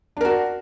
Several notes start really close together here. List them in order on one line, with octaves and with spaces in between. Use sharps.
D4 A#4 F#4